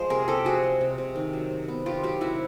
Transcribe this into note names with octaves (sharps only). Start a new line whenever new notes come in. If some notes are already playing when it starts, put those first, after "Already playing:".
Already playing: F3 G#3 C5
C3 G#4 A#4
C3 G4 A4
F3 F#4 G#4
G#3
C3
C3
D#3
F#3
C3
B3
D#3 F4 G4
F#3 F4 G4
C3 E4 F#4